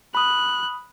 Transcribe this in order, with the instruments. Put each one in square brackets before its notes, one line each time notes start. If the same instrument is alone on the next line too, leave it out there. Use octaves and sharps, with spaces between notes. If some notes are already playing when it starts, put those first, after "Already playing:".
[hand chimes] B5 D#6 [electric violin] F#6